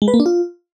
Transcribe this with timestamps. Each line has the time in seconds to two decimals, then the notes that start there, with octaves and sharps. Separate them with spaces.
0.02 G#3
0.08 B4
0.14 A#3
0.20 D4
0.26 F4